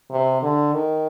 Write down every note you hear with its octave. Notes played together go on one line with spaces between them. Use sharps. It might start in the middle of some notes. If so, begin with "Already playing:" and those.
C3
D3
D#3